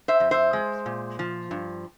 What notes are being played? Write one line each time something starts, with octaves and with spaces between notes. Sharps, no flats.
C5 E5
F2
C5 E5
G#3
A#2
F3
G2